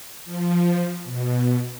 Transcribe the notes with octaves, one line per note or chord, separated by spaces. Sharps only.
F3
B2